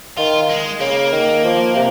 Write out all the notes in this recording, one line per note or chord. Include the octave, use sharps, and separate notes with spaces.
D#3 F4
G#3
C#3 A#3
D#3
F3
C3